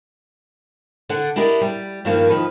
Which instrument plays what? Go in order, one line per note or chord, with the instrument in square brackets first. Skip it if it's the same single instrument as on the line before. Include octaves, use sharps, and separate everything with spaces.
[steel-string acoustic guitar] D3 D4 D5 F#5
D4 E4 G4 A#4 D5 D#5
G3
G2 D#3 F3 A#3 A5
D#3 F3 B4